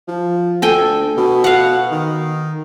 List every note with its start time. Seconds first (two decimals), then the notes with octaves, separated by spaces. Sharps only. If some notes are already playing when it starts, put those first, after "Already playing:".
0.08 F3
0.62 D2 A4 G5 G#5
1.17 B2
1.44 F5 F#5
1.91 D#3